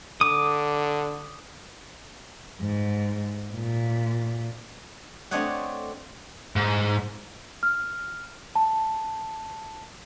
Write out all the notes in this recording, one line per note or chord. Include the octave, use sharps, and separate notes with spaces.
D3 D6 D#6
G#2
A#2
A3 C4 D4 C#5 D#5 F#5
G#2
F6
A5